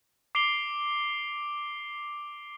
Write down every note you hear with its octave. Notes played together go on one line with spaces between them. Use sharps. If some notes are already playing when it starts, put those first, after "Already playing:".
D6 C7 D7 F7 G7